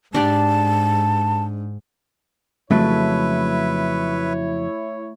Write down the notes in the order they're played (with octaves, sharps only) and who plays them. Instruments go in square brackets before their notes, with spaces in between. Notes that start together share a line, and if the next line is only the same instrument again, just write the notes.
[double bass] G#2 [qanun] D4 G4 D5 [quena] A5
[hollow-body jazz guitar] F2 C#3 F#3 [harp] A3 [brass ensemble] E4 C#5 [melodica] B4 E5